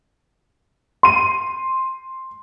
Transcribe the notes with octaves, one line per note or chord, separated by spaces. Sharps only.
C6 D#7